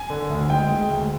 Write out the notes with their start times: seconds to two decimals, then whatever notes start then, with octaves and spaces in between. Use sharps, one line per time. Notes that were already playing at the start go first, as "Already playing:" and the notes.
Already playing: G#5
0.10 D3
0.30 D2
0.50 G#3 G5
0.70 G#3
0.90 D2